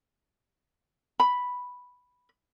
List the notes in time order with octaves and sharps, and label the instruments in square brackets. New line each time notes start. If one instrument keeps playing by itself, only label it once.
[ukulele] B5